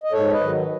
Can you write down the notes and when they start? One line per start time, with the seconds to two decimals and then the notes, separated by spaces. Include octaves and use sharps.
0.04 D#5
0.12 G#2 A4 C#5
0.31 B4 D#5
0.40 D#3 F#3